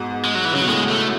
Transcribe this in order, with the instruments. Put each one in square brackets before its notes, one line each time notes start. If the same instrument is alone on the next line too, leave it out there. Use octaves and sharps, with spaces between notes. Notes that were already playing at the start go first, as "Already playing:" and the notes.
Already playing: [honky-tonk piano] G#2 B2
[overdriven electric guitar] G#3
F#3
E3
[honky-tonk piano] C#3 [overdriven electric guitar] F#3
[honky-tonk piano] B2
[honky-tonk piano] A2 [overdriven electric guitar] G#3
[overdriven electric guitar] A3